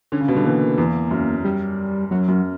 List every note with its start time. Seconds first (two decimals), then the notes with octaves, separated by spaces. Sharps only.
0.12 D3 C#4
0.20 C#3
0.28 B2
0.35 D3 G3
0.45 E3 A#3
0.78 E2
1.11 F#2
1.44 G3
2.11 F#2 F#3
2.28 F#2